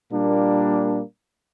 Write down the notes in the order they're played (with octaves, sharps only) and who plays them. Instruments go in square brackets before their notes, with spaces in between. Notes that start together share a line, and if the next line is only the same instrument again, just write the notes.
[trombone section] A#2 G3 A#3 D4